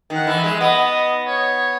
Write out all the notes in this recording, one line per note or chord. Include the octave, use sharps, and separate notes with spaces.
D#3
F#5
E3
E5
G#3
B3 D#5
C#5